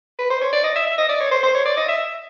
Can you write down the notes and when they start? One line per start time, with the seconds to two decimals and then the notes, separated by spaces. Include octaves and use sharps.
0.19 B4
0.30 C5
0.41 C#5
0.53 D5
0.64 D#5
0.75 E5
0.86 E5
0.98 D#5
1.09 D5
1.21 C#5
1.31 C5
1.43 C5
1.55 C#5
1.66 D5
1.77 D#5
1.88 E5